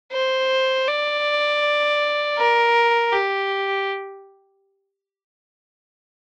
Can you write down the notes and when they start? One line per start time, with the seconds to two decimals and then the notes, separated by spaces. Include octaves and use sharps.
0.12 C5
0.87 D5
2.37 A#4
3.12 G4